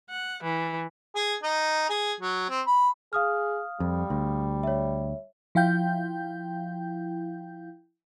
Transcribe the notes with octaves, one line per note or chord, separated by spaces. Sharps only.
F#5
E3
G#4
D#4
G#4
F#3
C4
B5
G#4 F5 D#6 F6
F2 G3
D2
C#5 E5
F3 E4 F5 G5 G6